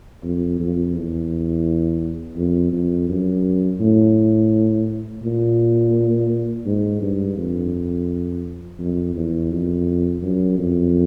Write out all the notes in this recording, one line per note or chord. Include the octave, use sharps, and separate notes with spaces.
F2
F2
E2
F2
F2
F#2
A2
A#2
G#2
G2
F2
F2
E2
F2
F#2
F2